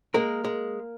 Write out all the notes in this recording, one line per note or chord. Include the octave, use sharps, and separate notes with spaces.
G#3 A#3 A#4
G#3